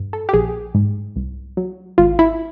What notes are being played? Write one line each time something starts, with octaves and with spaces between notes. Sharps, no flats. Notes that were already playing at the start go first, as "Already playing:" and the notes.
Already playing: G2
A4
G4
A#1 G#4
G#2
C2
F#3
G#1 F4
E4